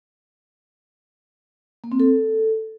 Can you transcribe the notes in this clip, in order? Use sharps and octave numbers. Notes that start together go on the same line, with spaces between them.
A#3
C4
A4